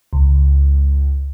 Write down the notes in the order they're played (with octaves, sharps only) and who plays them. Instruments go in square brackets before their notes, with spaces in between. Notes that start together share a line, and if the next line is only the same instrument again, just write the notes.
[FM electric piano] C#2